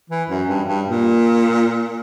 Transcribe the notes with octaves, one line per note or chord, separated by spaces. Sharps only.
E3
F#2
G2
G2
A#2